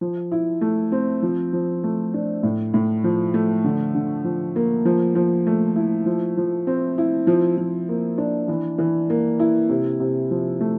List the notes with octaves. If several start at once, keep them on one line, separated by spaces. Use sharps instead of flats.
F3
E4
A3
C4
F3
F3
A3
D4
A2
A2
F3
A3
D3
D3
F3
A#3
F3
F3
A3
E4
F3
F3
C4
E4
F3
F3
A#3
D4
E3
E3
A#3
E4
C3
C3
F3
A3